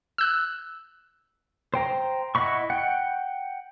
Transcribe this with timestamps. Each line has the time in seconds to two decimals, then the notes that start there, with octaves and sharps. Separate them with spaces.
0.18 E6 F#6
1.74 C5 G5 A#5
2.35 E4 D#5 F#5 B5 C#6
2.70 F#5 G5